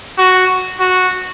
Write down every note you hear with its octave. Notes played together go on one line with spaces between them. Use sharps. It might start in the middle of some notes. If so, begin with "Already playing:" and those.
F#4
F#4